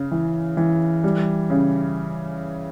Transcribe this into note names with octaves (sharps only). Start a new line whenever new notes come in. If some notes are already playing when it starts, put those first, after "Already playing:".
Already playing: C#3
E3
E3
G3
C#3